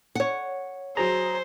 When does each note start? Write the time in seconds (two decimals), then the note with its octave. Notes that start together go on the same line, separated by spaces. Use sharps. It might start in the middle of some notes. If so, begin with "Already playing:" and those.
0.15 C#5 F#5
0.97 F#3 G#4 C5 A#5